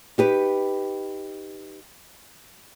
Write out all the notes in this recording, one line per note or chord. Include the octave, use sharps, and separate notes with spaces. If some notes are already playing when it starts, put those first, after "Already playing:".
D#4 G4 B4